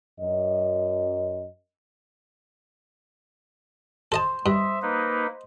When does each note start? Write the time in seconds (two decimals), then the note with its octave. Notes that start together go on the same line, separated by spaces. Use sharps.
0.19 F#2 D#5
4.12 A4 C5 D#5 A5
4.46 G2 D#5 E5
4.82 A#3 D#4 B4